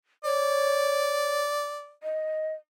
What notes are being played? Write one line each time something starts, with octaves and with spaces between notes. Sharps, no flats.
C#5 D5
D#5